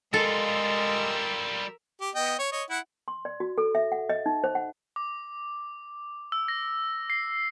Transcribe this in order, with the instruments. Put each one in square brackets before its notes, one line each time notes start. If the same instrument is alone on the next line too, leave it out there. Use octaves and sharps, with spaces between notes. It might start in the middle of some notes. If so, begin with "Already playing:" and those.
[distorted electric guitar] G3 F4 [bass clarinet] G#3 [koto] A4 [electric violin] A#4 E6
[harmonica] G4
B3 D#5 G5
C#5
C#5 D#5
E4 F#5
[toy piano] C6
D5
F#4
A4
E5
F#5
D#5
D#4
C5
F#5
[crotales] D6
E6
A#6
C7